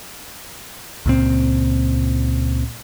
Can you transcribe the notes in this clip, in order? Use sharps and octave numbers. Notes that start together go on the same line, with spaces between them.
C#2 A#2 C4